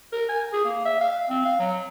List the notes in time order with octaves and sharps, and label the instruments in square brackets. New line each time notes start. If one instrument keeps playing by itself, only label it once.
[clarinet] A#4
G#5
G#4
A#3
E5
F5
C4
F5
F#3